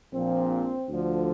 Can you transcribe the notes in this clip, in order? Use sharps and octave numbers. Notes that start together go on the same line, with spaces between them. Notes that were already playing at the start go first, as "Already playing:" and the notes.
A#1 A#2 F3 C4
D2 D3 F3